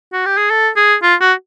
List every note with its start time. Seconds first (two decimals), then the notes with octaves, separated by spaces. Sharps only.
0.13 F#4
0.26 G4
0.37 G#4
0.50 A4
0.76 G#4
1.03 F4
1.21 F#4